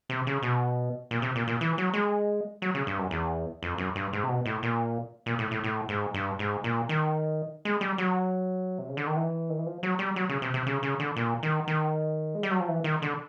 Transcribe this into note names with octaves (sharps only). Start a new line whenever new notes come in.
C3
C#3
B2
A#2
C3
A#2
A#2
E3
F#3
G#3
F#3
C#3
G2
F#2
E2
F2
F#2
G2
G#2
C3
B2
A2
A#2
A#2
A2
A2
A2
G#2
G2
G#2
A#2
D#3
G#3
G3
F#3
C3
C#3
D3
D#3
E3
D#3
E3
F3
F#3
G3
F#3
C#3
C3
C3
C#3
C#3
D3
A#2
D#3
D#3
G#3
G3
F#3
F3
E3
D#3
D3